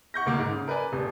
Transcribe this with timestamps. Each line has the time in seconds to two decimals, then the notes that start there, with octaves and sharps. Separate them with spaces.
0.14 F#5 C#6 G6 A#6
0.26 F1 D2 A#3 D6
0.38 G#2
0.51 C#3
0.68 A#4 B4 D5 G#5
0.92 D#1 C3